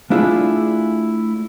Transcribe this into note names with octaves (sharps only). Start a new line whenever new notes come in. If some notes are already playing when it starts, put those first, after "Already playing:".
A3 D4 E4 F4 G#4